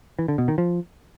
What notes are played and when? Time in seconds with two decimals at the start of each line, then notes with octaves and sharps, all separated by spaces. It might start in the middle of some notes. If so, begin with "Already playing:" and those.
0.19 E3
0.28 D3
0.38 B2
0.48 D#3
0.58 F3